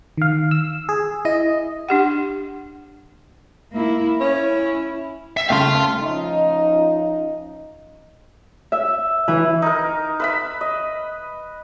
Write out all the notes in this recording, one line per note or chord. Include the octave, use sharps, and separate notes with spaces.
D#3 F5
E6
G#4
E4 D#5
D4 G4 F#5
A#3 E4
C#4 E4
E5
C#3 A3 F5 G5 C6
A3
F3 C#4 D#4 F4 D#5
E5
E3
D#4 A#4
B4 E5 B5
D#5